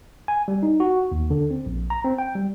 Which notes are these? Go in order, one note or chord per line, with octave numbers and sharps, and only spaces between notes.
G#5
G3
D#4
F#4
D#2
D3
C4
A#1
A#5
C4
G5
G3